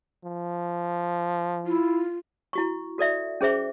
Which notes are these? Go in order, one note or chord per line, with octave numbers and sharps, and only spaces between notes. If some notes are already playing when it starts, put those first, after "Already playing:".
F3
E4 F4
E4 F#4 C#6
F#4 A4 D5 E5
C#4 G#4 C5 E5 D6